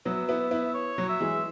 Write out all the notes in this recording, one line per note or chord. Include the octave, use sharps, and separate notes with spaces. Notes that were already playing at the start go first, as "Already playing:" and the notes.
F#3 B3 E5
B3 E4
B3 E4
C#5
F#3
E5
E3 G#3